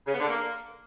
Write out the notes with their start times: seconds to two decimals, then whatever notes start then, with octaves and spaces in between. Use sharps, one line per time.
0.06 C#3
0.13 B3
0.20 D3
0.27 A#3